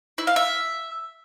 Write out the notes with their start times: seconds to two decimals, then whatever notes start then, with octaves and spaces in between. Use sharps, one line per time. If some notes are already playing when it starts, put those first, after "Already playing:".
0.18 E4
0.27 F5
0.36 E5